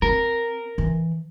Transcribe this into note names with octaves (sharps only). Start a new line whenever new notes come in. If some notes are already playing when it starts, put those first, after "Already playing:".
C4 A#4
E3